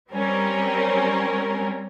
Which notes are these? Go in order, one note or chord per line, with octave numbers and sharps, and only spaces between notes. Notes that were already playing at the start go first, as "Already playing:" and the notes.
G3 C4 C#4 A#4